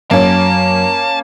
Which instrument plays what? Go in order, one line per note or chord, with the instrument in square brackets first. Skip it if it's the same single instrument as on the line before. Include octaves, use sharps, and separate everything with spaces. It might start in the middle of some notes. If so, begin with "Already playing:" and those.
[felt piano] F#2 [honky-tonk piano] A#3 C#4 [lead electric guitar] A5